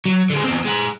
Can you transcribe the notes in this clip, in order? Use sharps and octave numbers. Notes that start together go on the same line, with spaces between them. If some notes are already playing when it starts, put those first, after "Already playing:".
F#3
D3 G#3
E2 C4
G#3 F#5